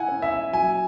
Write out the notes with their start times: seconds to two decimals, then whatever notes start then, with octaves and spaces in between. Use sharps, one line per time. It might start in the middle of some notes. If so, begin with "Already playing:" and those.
Already playing: E4 F#5 G#5
0.08 C#4
0.22 E5
0.53 F#3 G#5